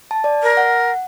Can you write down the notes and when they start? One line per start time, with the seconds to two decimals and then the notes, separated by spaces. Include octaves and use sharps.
0.11 A5
0.24 D5
0.43 A#4
0.57 F#5